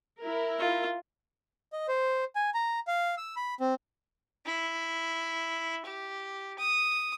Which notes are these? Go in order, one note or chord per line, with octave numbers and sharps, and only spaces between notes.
E4 A#4
F4
D#5
C5
G#5
A#5
F5
E6
B5
C4
E4
G4
D#6